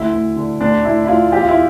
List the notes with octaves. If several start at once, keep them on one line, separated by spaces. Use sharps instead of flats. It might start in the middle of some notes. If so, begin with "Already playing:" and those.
Already playing: D2 E4
D2
D3
D2 D4
D2 E4
E4
D2 F4
E2 G4
F4
E4